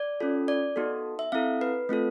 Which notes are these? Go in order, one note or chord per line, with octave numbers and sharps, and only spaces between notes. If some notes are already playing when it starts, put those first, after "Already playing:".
Already playing: D5
C#4 F4 A4
D5
B3 D#4 F#4 A4
E5
C4 E4 A4 F5
B4
A3 C4 F4 A4